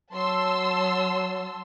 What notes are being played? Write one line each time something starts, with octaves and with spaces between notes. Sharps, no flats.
F#3 A5 C6 E6